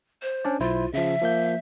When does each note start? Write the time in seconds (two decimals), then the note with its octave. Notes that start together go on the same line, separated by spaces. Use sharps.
0.22 C5
0.45 C#4 D4 D5
0.60 B1 E4 F4 C5
0.94 C#3 F3 E5
1.21 F3 A#3 G6